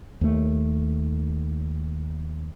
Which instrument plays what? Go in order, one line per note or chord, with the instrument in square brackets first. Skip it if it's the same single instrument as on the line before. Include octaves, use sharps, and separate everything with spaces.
[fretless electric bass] D#2 A3